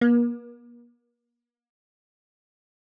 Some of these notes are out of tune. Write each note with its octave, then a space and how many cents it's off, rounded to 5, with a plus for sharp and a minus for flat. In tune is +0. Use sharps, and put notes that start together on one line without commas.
A#3 +40